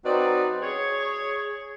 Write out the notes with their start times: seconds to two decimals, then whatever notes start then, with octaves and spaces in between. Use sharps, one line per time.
0.05 F#3 C4 D#4 B4 D5
0.62 G#4 C#5